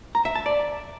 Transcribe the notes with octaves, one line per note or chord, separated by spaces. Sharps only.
A#5
E5
A5
D5